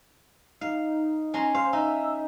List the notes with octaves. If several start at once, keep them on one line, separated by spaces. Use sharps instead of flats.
D#4 F5
C#4 A#5 C6
C5 F5
D#4 E5